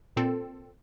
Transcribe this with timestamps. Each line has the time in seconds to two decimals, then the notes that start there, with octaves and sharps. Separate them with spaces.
0.16 A#2 C4 A4